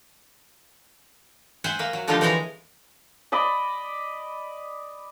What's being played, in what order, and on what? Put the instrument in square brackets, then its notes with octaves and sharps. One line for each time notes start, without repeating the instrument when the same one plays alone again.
[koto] C5 E5 F#5 G#5
A#3 E5
F#3
D3 F3 D4 D#4 F4 G4
E3 G#3 C#5 G#5 A#5
[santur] D5 D#5 B5